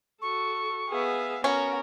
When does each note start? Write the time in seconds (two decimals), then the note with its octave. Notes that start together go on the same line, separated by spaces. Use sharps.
0.22 F#4 A4 C#6
0.89 B3 G#4 E5 F5
1.44 B3 C#4 F#4 A#4 C#5 C#6